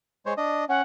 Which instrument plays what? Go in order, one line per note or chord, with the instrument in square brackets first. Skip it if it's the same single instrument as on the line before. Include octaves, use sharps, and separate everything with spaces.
[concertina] G#3 C5 C#5
D4 D#5
[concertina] C#4 [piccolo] F#5